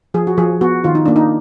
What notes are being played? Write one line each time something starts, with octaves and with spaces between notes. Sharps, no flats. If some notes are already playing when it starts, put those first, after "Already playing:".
F3 G#4
F#4
F3 G#4
B3 F#4
D#3 F4
D#4
A#3 D4
D#4